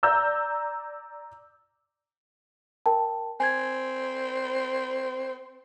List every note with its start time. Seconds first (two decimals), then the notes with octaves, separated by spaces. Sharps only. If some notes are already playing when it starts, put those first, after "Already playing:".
0.03 D5 A#5 E6 G6
2.86 A#4 G5 A5
3.40 C4 G#5 G#6